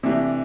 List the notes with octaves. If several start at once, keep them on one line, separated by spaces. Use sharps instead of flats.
C3 E3 A3 D4 G4